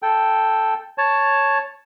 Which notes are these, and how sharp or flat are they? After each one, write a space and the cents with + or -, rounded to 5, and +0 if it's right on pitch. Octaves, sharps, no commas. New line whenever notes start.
A4 +0 G5 +0
C#5 +0 A5 +0